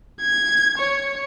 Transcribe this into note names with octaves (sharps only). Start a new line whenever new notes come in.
G#6
C#5